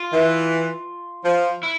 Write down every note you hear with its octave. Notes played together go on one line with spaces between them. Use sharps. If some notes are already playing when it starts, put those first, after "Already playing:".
Already playing: F4
E3
F3
E4